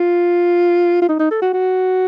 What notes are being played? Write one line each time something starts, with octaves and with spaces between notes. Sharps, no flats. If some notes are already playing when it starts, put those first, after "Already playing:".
Already playing: F4
F4
D#4
D#4
A4
F#4
F#4